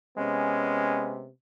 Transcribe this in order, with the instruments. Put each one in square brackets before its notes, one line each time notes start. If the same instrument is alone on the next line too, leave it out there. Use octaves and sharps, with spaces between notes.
[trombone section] C3 G#3 B3 C#4